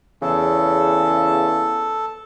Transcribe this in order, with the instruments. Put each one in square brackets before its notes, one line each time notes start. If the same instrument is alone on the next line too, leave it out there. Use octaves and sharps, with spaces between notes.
[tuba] E2 [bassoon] C#3 [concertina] A4